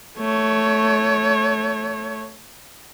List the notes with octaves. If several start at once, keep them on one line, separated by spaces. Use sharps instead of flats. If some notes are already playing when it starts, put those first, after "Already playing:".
A3 C#5